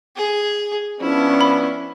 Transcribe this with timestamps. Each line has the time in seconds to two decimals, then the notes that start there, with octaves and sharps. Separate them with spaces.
0.16 G#4
1.01 F3 B3 C#4 D4 E4
1.41 B5